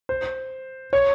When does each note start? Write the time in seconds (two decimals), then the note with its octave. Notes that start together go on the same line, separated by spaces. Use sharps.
0.09 C5
0.93 C#5